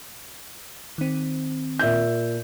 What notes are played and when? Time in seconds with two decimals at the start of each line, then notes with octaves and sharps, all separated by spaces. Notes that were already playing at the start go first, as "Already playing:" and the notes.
0.98 D#3 C4
1.79 A#2 E5 G6